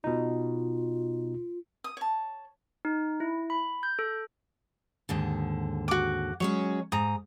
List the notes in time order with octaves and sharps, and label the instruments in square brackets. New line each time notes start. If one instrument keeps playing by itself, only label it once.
[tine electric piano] B2 D#4 [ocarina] F4
[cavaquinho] D#6
C#5 A5
[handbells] D#4
E4
B5
G6
A4
[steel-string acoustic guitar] D#2 G#2 D3
[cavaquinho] F#4 D6
[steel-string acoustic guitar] F#3 G#3 C#4 [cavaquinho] C#5
[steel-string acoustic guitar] G#2 [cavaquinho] A#5 D#6